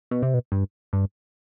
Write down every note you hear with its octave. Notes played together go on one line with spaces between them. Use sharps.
B2
C3
B2
G2
G2